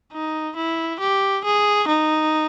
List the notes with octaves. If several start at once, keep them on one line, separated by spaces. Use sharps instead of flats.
D#4
E4
G4
G#4
D#4